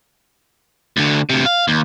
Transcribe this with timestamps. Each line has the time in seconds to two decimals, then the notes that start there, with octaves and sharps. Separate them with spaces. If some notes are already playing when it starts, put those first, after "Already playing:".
0.97 D2 D3
1.30 D2 C3
1.46 F5
1.68 D#2